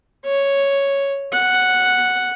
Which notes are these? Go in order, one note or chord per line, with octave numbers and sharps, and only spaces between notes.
C#5
F#5